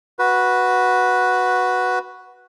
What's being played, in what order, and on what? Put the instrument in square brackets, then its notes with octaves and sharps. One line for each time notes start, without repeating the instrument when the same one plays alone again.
[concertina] F#4 B4